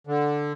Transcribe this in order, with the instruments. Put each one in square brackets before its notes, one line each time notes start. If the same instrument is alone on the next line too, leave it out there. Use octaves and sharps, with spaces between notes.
[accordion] D3